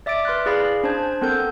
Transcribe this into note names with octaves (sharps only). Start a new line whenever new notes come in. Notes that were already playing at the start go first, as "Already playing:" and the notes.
D5 E5 D6 A6 D7
B4 C6 F6 F#6
E4 G#4 D5 F5 B5
C#4 D4 C5 A5 F#6 G#6
B3 C4 A4 A#4 G6